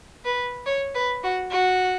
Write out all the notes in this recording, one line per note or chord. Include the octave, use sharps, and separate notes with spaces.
B4
C#5
B4
F#4
F#4